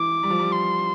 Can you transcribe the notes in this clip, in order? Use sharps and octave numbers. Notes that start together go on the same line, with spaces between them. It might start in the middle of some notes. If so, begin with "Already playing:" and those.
Already playing: E3 D6
G3
F3
G3
C6